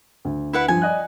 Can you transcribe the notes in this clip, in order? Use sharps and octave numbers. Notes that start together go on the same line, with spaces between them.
D2
E4 B4 F#5
G2 F3 G#5
D5 D#5 F#6